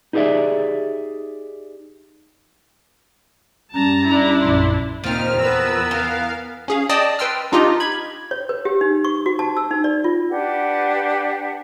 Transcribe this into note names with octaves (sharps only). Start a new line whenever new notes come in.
D#4 G4 G#4 B4 D5 E5
F#2 G3 C#4 A5 A#5
D4 E4
A#1 F#2 C6
D#2 A#2 D#3 F3 C4 D#4 F6
E2 B3 A#4 B4 E6
E3 F5
C#4 G#4 F5
D5 D#5 G5 A5 D#6
B4 G5 C6 E6 F6
D4 D#4 F4 G4 D#5
B5 G#6
C#5
B4
G4
D#4
C#6
F#4
A5
E6
D#4
D5
F4
D4 G4 B4 F#5